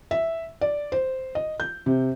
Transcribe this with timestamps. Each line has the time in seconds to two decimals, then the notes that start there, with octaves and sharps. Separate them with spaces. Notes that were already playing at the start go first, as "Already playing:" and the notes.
0.11 E5
0.61 D5
0.92 C5
1.35 D#5
1.60 G6
1.86 C3